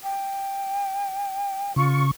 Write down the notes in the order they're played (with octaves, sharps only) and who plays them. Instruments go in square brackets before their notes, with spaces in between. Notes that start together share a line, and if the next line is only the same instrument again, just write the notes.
[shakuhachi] G5
[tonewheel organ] C#3 C#6 [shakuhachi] F4